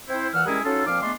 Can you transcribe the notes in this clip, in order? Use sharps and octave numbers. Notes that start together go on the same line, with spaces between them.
C4 E4 C5
A#2 E3 F#5 E6 F6
G3 G#3 C#4 E4 G#4 A#4
F#3 C#4 D#4 F4 A4
A#2 F3 C4 F5 D6 F6
G#3 A3 B3 D4 C6 D6